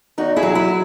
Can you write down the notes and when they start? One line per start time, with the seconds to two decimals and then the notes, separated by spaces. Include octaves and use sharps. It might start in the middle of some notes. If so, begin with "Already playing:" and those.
0.18 E2 D#4 F#4
0.36 E4 G#4
0.43 F#3
0.55 E4